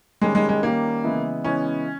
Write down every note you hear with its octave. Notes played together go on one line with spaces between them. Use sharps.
D#3 G3 G#3 C#4 G4 A#4
G#3
G#3
D#3 G3 A#3 C#4 G4 A#4
C#3 E3 G#3 B3 E4
C#3 E3 G#3 B3 C#4 E4